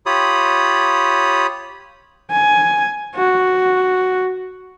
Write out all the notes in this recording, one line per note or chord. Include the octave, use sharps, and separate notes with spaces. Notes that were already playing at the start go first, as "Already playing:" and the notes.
F4 G4 C#5 B5 D#6
G#5
F#4